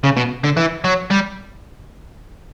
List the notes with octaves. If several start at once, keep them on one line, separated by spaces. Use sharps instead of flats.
C#3
B2
D3
E3
F#3
G3